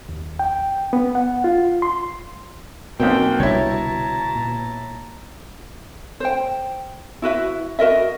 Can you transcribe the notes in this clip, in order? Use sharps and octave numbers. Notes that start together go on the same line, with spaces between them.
D#2
G5
B3
F#5
F4
C6
B1 B2 A#3 C4 G5 C6
C2 D3 G3 E4 C#5 A5 A#5
A#2
C5 G5
E4 F#4 B4 E5
F#4 A#4 D#5 E5